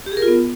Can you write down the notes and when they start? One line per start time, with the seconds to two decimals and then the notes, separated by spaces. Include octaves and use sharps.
0.06 G4
0.12 G#4
0.17 A#4
0.22 F4
0.28 B3